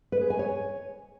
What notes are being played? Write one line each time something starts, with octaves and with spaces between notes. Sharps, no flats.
B4
G#4
G#5
C#5